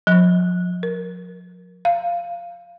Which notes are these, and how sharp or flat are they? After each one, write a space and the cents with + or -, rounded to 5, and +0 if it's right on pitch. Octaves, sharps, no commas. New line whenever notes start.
F3 +40
A#4 +10
F5 -10